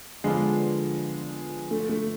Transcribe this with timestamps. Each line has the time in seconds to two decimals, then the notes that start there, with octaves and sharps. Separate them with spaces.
0.24 D3 F3 G#3 B3 D4 F4
1.71 A3
1.89 A3